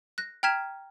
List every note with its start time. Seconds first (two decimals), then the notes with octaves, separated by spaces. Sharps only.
0.18 F#6 A#6
0.43 G5 A#5 F6 G#6 B6 E7